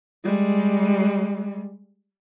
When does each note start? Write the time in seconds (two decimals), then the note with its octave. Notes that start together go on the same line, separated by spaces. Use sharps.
0.24 G3 G#3